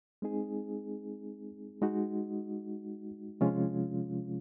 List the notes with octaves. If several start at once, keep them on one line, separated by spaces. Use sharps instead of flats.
G#3 C4 D#4 G#4
G#3 D#4 F#4
C3 F3 G#3 C#4 F4